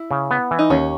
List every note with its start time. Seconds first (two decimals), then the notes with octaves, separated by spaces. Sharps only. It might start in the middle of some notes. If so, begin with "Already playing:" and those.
Already playing: E4
0.11 C#3
0.31 B3
0.51 E3
0.59 D#4
0.70 D#2 C#4